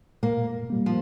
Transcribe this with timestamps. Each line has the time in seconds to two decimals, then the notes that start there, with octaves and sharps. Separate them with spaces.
0.23 A#2 A#3
0.70 G3 A#3
0.86 F3